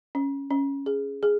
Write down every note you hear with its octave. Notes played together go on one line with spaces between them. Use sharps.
C#4
C#4
G#4
G#4